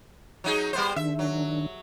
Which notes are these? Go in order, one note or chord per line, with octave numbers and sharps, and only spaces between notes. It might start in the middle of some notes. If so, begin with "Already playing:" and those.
F#3 D#4 G#4
G3 B3 C5
D#3 D4 E5
F#3